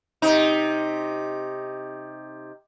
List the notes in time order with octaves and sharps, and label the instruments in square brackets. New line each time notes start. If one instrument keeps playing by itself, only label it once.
[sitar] C3 D#4